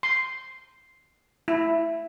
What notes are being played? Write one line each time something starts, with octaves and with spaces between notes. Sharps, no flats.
C6
E4